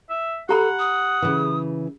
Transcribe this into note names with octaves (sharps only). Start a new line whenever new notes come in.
E5
G4 A4 F#5 A#5 B5
D#6
C#3 E3